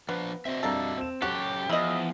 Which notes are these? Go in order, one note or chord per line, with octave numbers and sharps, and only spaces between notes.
F3 B3 D4
C4 F#4 D#5 E5
F2 G3 A#3 D4 A4
C4 E7
F#3 C#4 F#4 G4 A4 F#6
E2 F3 E4 D#5